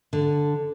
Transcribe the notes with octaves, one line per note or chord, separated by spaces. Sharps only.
D3